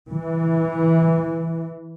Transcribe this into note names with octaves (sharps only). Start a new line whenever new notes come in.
E3